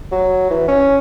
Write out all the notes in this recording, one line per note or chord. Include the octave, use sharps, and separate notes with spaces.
F#3
E3
C#4